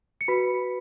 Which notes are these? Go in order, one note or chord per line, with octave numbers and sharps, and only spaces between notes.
C#7
F#4 B4 B5 B6